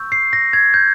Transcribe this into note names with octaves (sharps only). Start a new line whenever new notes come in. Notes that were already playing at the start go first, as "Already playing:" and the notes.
Already playing: C#6 E6 G6
C7
A#6
G#6
G6